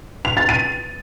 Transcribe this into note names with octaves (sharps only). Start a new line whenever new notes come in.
F7
A6
D#7